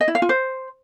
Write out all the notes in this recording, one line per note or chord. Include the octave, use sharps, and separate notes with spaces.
D#5
E4
F5
F4
C5